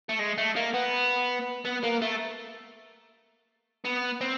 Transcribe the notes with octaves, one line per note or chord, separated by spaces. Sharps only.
A3
G#3
A3
A#3
B3
B3
A#3
A3
B3
C4